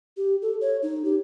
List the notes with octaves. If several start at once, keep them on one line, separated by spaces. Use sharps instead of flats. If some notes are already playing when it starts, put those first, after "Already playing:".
G4
A4
C#5
D#4
G4